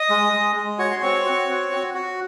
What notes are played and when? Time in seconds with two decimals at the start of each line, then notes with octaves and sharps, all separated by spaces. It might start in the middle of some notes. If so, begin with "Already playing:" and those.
Already playing: D#5 D#6
0.10 G#3
0.33 G#3
0.56 G#3
0.79 F#4 C#5 C#6
0.91 C6
1.02 C4 C#5 C#6
1.25 F#4
1.49 C4
1.71 F#4
1.94 F#4